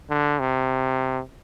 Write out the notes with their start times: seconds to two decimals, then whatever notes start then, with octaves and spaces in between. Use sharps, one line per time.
0.10 D3
0.39 C3